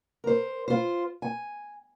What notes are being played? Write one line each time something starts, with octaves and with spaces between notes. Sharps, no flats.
A#4 C5
F4 C5
G#5